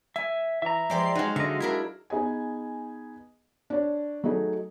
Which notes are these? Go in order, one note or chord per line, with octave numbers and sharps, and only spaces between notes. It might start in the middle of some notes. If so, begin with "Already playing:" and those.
E5 G#5
E3 E5 A#5
F3 G#3 G4 C5 D5 C7
F#3 G#3 D#4 F#4 F5
D3 D#5 E5
D4 E4 A#4 E5
B3 D#4 G#4 D#5 G#5
D4 C#5
F#3 A3 D#4 G#4